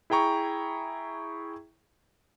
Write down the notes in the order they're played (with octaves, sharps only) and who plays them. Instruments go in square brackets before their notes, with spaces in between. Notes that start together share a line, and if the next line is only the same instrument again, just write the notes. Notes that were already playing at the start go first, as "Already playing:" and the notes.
[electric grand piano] E4 G#4 G5 A#5 C#6